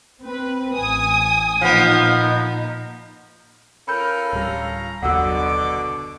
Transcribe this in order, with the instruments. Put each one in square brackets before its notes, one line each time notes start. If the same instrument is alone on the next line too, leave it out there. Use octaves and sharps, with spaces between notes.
[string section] C4 B4
A1 G#5 D#6
[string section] A#2 D#4 [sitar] F3 B3
[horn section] C#4 F4 A4 [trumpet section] A#4 [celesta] B5 G6
[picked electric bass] D1 G3 [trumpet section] F5 A#5
[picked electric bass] F#1 D#2 F#3 [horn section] B2 D3 [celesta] F#5 E6 [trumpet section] D6